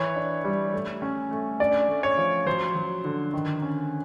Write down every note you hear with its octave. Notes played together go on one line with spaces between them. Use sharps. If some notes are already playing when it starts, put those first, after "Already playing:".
Already playing: E3 C#5
D4
G3
A3
C#4
A3
D4 D5
A3
C#5
F3
F#3 C5
F#3
D3
D#3
C#4